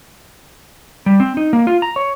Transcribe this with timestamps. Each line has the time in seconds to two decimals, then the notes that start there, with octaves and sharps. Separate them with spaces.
1.06 G3
1.20 C4
1.37 D#4
1.53 A#3
1.67 F4
1.82 A#5
1.96 C#5